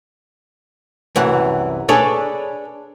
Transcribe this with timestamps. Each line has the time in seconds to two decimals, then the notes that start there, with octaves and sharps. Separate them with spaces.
1.16 C2 F#2 E3 F#5
1.89 D4 G#4 A4 B4 C#5 D5